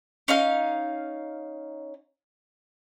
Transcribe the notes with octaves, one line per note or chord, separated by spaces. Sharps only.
C#4 D#4 F5